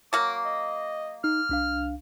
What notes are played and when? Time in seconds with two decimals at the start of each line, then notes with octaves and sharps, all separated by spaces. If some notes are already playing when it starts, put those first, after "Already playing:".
0.13 F#3 A#3 D6
0.45 D#5
1.24 D#4 F6
1.49 C2 D4 F5